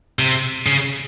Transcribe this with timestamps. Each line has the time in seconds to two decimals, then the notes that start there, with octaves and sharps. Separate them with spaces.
0.19 C3
0.66 C#3